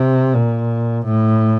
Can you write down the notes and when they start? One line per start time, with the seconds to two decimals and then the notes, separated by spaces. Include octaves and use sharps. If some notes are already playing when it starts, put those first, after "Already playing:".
Already playing: C3
0.34 A#2
1.05 A2